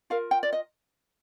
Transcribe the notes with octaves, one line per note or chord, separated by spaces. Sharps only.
F4 A#4 F5
G5
D5
D#5